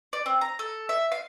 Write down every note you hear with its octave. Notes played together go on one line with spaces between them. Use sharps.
D5
C4
A#5
A4
E5
F5